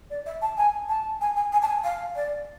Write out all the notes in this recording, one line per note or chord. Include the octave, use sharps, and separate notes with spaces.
D5
E5
A5
G#5
A5
G#5
G#5
G#5
A5
G#5
F5
D5